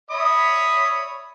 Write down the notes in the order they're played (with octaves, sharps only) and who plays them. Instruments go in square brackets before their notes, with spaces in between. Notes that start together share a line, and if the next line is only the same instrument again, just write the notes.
[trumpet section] C#5 B5 [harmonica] E5 D#6